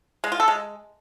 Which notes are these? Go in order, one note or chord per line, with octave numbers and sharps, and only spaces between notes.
G#3
F4
A4
G#3